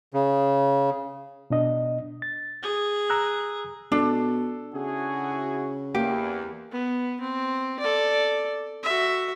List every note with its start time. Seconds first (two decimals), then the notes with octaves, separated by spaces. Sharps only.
0.14 C#3
1.50 B2 D4 D#5
2.22 A6
2.63 G#4
3.10 A#5 E6 F#6
3.92 B2 D4 A4
4.74 C#3 E4 F#4 G#4
5.95 E2 A#3 G4
6.72 B3
7.21 C4
7.79 A4 D5
8.83 F#4 E5